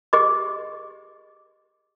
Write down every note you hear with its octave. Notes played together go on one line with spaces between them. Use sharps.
G4 G#4 D#5 D6